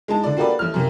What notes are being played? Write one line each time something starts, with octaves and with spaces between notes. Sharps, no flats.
G#3 D#4 A5
D3 D5
A#3 F#4 G4 A4 B4 D5
A1 A3 F6
F#2 C3 A#3